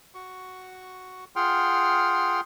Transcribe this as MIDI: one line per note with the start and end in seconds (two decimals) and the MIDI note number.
0.15 1.25 66
0.15 1.25 85
1.36 2.41 65
1.36 2.41 68
1.36 2.41 78
1.36 2.41 79
1.36 2.41 84
1.36 2.41 89